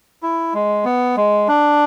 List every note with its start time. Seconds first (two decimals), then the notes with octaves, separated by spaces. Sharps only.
0.23 E4
0.54 G#3
0.85 B3
1.17 G#3
1.48 D4